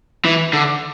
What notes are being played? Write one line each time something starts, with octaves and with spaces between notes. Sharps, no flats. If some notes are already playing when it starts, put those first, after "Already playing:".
E3
D3